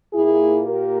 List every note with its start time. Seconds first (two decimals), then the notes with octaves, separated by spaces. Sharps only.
0.14 A#2 A#3 E4 G#4
0.62 G4 A#4